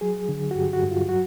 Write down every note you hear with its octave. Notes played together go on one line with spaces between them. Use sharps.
F#3 G#4
D3
F#4
G2 G4
F#4
G2
F4
F#3 F#4